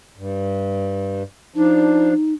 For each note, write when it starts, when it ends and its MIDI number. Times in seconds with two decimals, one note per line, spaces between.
0.17 1.23 43
1.56 2.14 53
1.56 2.14 62
1.56 2.34 63